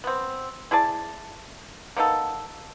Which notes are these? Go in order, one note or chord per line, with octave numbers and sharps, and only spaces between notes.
B3 C4
E4 G#4 D5 A5
A#3 B3 D#4 A4